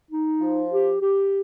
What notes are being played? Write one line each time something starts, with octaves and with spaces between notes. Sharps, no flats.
D#4
F3
G4
G4